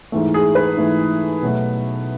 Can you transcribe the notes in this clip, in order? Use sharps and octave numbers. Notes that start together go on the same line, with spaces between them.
G#2 E3 A3
G#4
B4
G#2 E3 A3
B2 F#3 A3